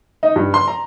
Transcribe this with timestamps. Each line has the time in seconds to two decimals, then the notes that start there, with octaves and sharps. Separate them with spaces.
0.23 D#4
0.36 G2
0.54 C6
0.68 A#5